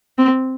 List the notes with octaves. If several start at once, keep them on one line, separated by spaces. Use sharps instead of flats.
C4